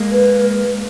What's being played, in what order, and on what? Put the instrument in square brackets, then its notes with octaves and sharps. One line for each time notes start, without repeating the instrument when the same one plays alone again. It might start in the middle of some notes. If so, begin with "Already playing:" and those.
Already playing: [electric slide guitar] G#3 A#3
[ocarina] B4